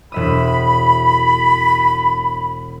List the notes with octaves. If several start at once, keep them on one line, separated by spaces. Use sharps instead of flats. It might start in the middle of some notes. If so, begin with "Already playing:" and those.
E1 E5 B5 D#6